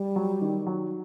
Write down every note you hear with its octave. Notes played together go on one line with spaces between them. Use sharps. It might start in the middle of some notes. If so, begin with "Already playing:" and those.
Already playing: G3
F#3
D#3
F#3